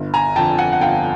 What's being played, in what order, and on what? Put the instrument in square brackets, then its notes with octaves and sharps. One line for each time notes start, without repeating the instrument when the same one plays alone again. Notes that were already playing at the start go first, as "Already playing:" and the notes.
Already playing: [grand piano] G1
G#5 A#5
F2 D3 G5 A5
F#5 G#5
F#5
G1 F5 G5